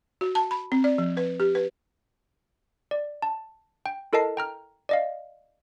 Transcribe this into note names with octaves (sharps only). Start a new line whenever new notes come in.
F#4
A5
B5
C4
D5
F3
B4
G4
B4
D5
A5
G5
E4 A4 A#4 D#5 A5 C7
G5 A#5 F6
D5 D#5 F5